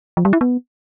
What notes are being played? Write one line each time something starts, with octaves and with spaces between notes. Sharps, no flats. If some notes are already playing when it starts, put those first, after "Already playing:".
F3
G3
E4
B3